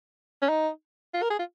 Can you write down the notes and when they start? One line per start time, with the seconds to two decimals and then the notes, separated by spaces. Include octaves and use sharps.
0.42 C#4
0.49 D#4
1.14 F4
1.22 A#4
1.30 G#4
1.39 F4